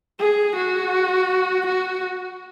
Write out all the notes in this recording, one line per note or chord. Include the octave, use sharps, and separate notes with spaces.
G#4
F#4
F#4